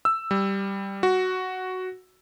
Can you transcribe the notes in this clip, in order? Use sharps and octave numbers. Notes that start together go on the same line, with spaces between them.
E6
G3
F#4